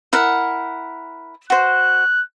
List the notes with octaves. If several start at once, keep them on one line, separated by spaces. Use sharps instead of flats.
E4 A#4 F#5
F#4 C5 F#6